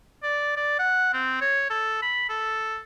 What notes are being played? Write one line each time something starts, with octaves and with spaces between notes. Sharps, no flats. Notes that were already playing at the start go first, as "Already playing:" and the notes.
D5
D5
F#5
C4
C#5
A4
B5
A4